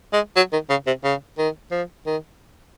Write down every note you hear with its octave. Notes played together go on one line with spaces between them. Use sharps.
G#3
F#3
D#3
C#3
C3
C#3
D#3
F3
D#3